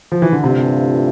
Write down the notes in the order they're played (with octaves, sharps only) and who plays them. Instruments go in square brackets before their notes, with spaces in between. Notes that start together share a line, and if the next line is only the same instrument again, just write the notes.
[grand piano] F3
E3
D3
[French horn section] G2 E3 A3 D4 F4 [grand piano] C3